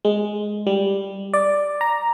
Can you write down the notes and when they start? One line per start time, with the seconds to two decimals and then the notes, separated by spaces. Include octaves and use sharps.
0.05 G#3
0.67 G3
1.34 D5
1.81 A#5